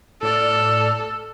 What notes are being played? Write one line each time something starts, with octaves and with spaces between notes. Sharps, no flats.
A2 A4 D5 F6